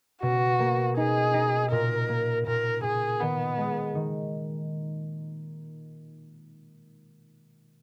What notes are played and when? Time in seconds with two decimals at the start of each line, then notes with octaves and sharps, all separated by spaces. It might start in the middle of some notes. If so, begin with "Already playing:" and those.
0.22 B2 F#4
0.59 A#3
0.97 D#4 G#4
1.34 D#4
1.71 A#2 A#4
2.08 A#3
2.47 A#2 A#4
2.83 A#2 G#4
3.20 D#3 B3
3.58 G#3
3.95 D#3